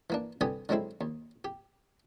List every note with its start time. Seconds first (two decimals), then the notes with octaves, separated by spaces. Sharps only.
0.10 E3 A#3 D4
0.41 C2 D3 B3 G4 G#5 D#6
0.69 D3 F#3 G#3 C4 E4
1.01 D#2
1.44 G4